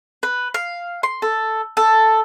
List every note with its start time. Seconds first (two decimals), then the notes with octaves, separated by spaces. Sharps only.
0.23 B4
0.54 F5
1.03 C6
1.22 A4
1.77 A4